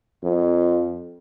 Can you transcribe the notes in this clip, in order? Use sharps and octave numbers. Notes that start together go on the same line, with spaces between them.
F2